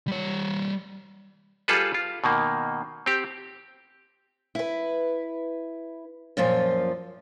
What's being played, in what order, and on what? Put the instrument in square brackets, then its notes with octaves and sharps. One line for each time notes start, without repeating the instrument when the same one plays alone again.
[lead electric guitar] G3 C#5
[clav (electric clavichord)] G3 F4 G#4 A4 B4
F4
B2 D#3 A#3
C4 G4
[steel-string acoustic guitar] E4 B4
F#2 A#2 F3 F4